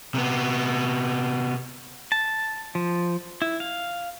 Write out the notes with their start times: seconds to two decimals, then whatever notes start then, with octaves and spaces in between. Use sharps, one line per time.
0.15 C3 B3
2.12 A5
2.75 F3
3.42 E4
3.60 F5